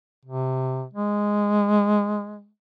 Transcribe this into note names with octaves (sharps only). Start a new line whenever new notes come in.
C3
G#3